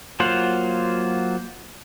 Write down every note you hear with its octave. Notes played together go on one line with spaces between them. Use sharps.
F#3 A#3 F4 C5 F#5